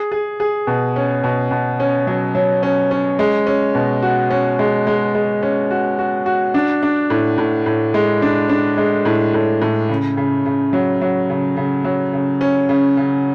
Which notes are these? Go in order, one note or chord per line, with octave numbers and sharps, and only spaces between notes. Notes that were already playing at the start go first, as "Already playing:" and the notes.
Already playing: G#4
G#4
G#4
B2
C#4
B2
B2
C#4
F#3
F#3
C#4
C#4
G#3
C#4
B2
F#4
C#4
G#3
G#3
G#3
C#4
F#4
F#4
F#4
D4
D4
A2
A2
A2
G#3
D4
D4
G#3
A2
A2
A2
C#3
C#3
C#3
F#3
F#3
C#3
C#3
F#3
C#3
C#4
C#3
C#3